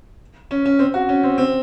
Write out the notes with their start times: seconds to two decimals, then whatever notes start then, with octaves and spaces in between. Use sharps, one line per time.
0.51 C#4
0.66 C#4
0.79 C4
0.94 F#4
1.09 C#4
1.23 C4
1.38 C4